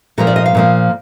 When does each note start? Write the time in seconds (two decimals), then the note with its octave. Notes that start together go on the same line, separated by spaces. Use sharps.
0.18 A#2 F3 A#3 A#4
0.27 D5
0.36 D#5
0.46 F5
0.55 A#2 F3 A#3